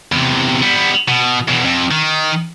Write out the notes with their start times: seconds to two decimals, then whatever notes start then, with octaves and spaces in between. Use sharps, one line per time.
0.12 E2 C3
0.62 G3 B3
1.08 B2
1.49 E2 B2
1.65 F2
1.91 D#3